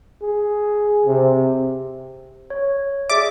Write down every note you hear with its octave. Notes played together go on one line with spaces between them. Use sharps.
G#4
C3
C#5
G#4 D5 E5 D6